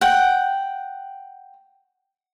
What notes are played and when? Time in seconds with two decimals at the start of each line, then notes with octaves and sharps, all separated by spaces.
0.01 F#5 G5